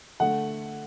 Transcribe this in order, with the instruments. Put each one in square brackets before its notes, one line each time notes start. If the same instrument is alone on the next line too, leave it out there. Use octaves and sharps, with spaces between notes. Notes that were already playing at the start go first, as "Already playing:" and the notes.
[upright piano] D3 A3 F#5